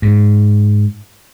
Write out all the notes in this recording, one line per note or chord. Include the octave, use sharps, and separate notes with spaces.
G#2